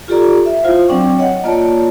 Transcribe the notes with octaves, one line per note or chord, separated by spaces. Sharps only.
F4 G4 A4 D5 A#5
E5
E4 F4 C5 F5
F#3 C4 D4 D5 G5 C#6
C#5 D#5 F#5
A#3 F4 C#5 D5 A5